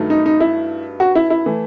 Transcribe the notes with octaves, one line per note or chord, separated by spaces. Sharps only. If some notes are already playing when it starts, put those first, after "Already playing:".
Already playing: G2 D#3 F#3 A3
D#4
D#4
E4
F#4
E4
E4
E3 A3